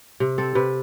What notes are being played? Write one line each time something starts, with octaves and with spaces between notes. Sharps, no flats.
C3
C4 A4
C3 B4